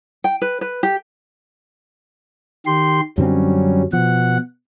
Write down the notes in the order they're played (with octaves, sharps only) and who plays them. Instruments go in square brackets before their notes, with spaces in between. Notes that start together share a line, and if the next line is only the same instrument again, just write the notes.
[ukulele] G5
B4
B4
G4
[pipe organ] D#3 G4 C6
[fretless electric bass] F#2 D3 C4 [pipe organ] F#3 G3 C#4
[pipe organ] B2 F#5 [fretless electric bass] F3